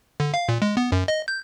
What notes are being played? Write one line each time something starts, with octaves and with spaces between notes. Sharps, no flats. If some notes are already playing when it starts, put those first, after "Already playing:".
D3
F5
A#2
G#3
B3
F#2
D#5
G6